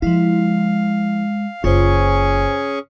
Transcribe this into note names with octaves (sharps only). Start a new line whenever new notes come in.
F3 G#3 E4 F5
F#1 C#4 F4 G#4 C5 C#6